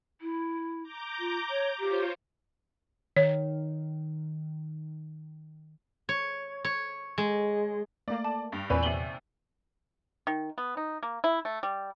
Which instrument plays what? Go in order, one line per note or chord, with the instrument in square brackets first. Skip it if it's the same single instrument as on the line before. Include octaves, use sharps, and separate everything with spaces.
[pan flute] E4
[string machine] A#5 D6 G6
[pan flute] F4
C#5
[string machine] F4 C5 C#5 [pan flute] G4
[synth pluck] D#3 [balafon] C#5
[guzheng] C#5
C#5
G#3
[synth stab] A3 A#3 [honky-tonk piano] D5
[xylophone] A5
[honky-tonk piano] G2
[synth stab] E2 A#2 [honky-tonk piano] C4 B4 C#5 [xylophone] D5 G#5
[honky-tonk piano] D#2 C3 [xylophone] F#7 G7
[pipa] D#3
B3
D#4
A#3
E4
A3
G3